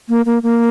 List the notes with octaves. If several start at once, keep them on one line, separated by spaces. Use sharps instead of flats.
A#3
A#3
A#3